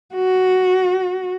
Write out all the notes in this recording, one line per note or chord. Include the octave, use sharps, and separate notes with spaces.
F#4